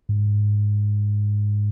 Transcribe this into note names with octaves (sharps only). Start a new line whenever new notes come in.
G#2